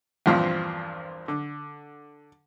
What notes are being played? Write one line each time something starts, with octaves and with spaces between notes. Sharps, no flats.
E2 G2 A#2 F3 C4 F5
D3